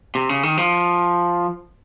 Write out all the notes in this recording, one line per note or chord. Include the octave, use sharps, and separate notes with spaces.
C3
C#3
D#3
F3